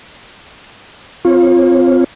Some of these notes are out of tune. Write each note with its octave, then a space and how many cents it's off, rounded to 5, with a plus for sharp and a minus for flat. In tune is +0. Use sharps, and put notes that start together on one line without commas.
C4 -15 F4 +0 C#5 -35